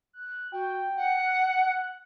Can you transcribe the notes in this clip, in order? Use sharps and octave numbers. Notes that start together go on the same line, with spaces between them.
F#6
F#4 G5
F#5
F#6